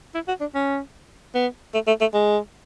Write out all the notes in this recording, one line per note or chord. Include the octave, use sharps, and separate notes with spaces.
E4
F#4
D4
C#4
B3
A3
A3
A3
G#3